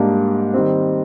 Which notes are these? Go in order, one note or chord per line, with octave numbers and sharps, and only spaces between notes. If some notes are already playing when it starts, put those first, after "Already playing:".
Already playing: G#2 G3 A#3 D4
D#3 G3 C4